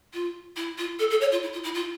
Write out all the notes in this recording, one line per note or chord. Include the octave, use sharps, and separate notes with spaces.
F4
E4
F4
A4
A4
C#5
F4
E4
F4
E4
F4